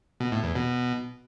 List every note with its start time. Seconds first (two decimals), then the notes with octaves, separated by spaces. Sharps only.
0.20 B2
0.32 A2
0.44 E2
0.55 B2